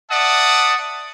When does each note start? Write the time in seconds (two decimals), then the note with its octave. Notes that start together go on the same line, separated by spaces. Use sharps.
0.11 D5 E5 F#5 A5 D#6